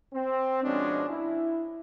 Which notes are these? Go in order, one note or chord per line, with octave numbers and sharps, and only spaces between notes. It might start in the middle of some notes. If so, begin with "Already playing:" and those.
C4
B2 F3 G#3 C#4 D4
E4